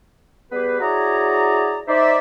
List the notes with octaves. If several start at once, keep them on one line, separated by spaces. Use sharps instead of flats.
G3 B3 G4 G#4 B4
E4 F#4 G#4 C#5 D5 A#5
D#4 C5 D5 E5